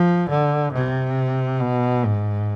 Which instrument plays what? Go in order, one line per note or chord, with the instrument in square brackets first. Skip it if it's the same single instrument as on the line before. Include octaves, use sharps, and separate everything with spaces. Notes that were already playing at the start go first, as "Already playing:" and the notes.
Already playing: [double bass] F3
D3
C3
B2
G#2